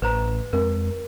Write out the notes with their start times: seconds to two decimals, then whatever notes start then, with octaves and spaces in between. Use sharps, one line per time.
0.02 A1 B4 C5 A#5
0.53 F2 G#3 C4 A#4